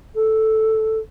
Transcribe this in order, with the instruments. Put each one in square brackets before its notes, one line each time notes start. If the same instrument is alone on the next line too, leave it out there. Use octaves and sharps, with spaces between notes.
[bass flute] A4